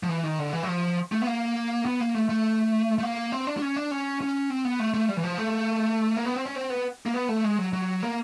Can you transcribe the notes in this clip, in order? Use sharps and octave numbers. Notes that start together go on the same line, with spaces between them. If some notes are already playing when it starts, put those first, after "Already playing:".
F3
E3
D#3
D3
E3
F#3
F3
A3
B3
A#3
B3
A#3
A3
A3
A3
A#3
C4
D4
D4
C#4
D4
C#4
C#4
C4
B3
A3
A3
G3
E3
F3
A3
A#3
B3
C4
C#4
C4
B3
A#3
B3
A3
G#3
F#3
F#3
A#3